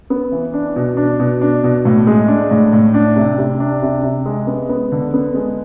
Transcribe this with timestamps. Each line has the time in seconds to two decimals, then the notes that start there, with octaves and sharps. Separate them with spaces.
0.10 B3
0.32 E3
0.53 D4
0.76 B2
0.97 D4
1.19 B2
1.41 D4
1.64 B2
1.85 A2
2.07 G#3
2.28 D4
2.51 A2
2.73 A2
2.94 D4
3.16 C3
3.38 C3
3.60 D4
3.82 C3
4.03 C3
4.26 G#3
4.47 B3
4.69 B3
4.92 D3
5.14 B3
5.34 G#3